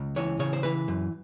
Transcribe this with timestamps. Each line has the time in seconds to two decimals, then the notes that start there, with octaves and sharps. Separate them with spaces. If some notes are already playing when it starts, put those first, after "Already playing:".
Already playing: C#2
0.16 E3 C#5
0.39 C#3 C#5
0.53 C5
0.63 E3 B4
0.88 F#2